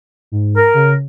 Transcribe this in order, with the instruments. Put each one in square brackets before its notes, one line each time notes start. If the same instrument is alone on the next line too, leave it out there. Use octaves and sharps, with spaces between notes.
[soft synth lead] G#2
[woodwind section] A#4
[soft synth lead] C#3